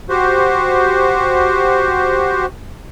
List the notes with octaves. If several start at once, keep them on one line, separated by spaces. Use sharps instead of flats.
F#4 G4 C5